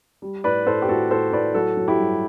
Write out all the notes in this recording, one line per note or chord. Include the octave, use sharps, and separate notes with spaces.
G3
A2 B4 D5
A2 A4 C5
G4
A2 F#4 A4
A2 A4 C5
A2 B4 D5
F#3 F#4 A4
F#3
E4 G4
G2